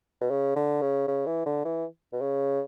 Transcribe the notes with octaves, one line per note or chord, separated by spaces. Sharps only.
B2
C#3
D3
C#3
C#3
E3
D3
E3
B2
C#3